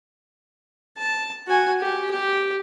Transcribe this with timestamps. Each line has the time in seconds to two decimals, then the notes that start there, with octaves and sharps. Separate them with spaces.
0.98 A5
1.47 F#4 G#5
1.81 G4
2.11 G4